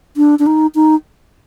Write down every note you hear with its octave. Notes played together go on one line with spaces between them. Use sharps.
D4
D4
D#4
D#4